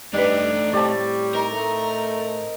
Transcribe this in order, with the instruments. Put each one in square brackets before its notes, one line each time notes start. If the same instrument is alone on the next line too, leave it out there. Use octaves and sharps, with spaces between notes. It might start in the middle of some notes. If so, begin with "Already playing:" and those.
[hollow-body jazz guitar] G3 B4 [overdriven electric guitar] A3 D#4 [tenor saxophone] D4
[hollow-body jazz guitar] A2 A5 [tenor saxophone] G3 [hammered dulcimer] C4 C#5 D5
[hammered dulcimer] D#4 [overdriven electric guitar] A#4
[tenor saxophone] A3